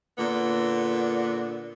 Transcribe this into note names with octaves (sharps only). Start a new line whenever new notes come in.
A#2 D3 B3